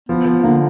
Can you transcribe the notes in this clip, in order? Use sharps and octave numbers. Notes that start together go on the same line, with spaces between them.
F3 B3
F3
D3 A#3